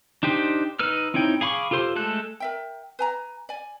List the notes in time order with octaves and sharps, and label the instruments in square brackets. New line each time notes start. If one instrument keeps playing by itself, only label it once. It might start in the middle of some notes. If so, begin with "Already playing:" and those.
[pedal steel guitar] D4 D#4 G4 C5
D#4 B4 E6 F6
C4 D#4 E4 C#5 G5
G#4 F5 B5 C#6 D6
F4 G4 A4 C5 C6
G#3 A3 A4 F#6
[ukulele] A#4 E5 G5
B4 G#5 A#5
D5 G#5